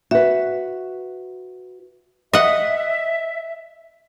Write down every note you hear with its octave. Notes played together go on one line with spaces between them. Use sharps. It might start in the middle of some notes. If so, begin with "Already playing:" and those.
F#4 B4 E5
D#5 E5 F#5